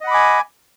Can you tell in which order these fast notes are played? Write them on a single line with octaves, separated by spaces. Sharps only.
D#5 F#5 B5 D6 G#5